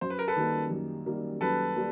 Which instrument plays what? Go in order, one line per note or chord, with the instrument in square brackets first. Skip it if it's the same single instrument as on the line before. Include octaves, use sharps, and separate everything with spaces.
[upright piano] F#2 [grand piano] C5
[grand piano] B4
A#4
A4 B4
[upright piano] D#3 G3 A#3
F#2
D#3 G3 A#3
[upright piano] F#2 [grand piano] A4 B4
[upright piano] G3 A#3